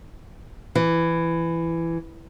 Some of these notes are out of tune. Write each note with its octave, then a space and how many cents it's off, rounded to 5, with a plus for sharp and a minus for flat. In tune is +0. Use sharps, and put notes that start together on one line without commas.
E3 +15